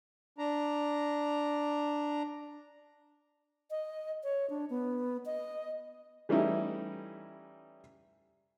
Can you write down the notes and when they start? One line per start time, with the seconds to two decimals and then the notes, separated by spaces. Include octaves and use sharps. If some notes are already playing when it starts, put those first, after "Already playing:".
0.38 D4 A#5
3.71 D#5
4.24 C#5
4.50 D4
4.70 B3
5.26 D#5
6.29 E3 G3 A3 C#4 D#4 E4